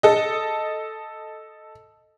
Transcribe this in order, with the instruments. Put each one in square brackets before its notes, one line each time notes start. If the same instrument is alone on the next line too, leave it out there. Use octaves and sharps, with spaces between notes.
[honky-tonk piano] A4 D#5